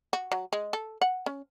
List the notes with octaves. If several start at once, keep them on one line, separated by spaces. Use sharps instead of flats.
F#4
F#3
G#3
A4
F#5
C#4